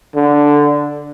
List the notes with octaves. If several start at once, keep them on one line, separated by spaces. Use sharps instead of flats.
D3